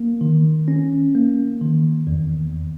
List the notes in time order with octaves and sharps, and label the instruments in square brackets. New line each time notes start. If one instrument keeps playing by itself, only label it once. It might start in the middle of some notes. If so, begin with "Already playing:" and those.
Already playing: [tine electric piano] A#3
D#3
C#4
A#3
D#3
E2